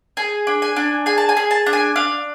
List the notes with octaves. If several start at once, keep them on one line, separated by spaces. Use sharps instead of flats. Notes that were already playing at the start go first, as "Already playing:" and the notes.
G#4 G#5
D4
G#5
D4
G#4 G#5
A5
G#5
G#4
A5
D4
G#5
D4 F5